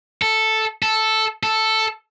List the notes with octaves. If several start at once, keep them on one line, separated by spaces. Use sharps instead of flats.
A4
A4
A4